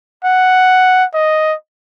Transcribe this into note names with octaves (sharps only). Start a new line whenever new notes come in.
F#5
D#5